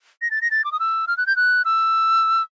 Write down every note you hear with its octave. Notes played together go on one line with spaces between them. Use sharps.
A#6
A6
A#6
A6
D6
D#6
E6
F6
F#6
G6
F#6
E6